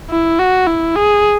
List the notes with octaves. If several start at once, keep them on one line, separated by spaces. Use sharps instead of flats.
E4
F#4
E4
G#4